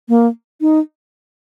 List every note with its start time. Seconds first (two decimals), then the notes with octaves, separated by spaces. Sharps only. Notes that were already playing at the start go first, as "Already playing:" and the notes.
0.09 A#3
0.61 D#4